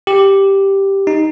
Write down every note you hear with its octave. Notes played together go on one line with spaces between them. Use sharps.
G4
D#4